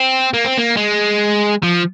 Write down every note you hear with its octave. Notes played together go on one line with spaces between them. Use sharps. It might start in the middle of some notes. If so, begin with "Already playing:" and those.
Already playing: C4
A#3
C4
A#3
G#3
F3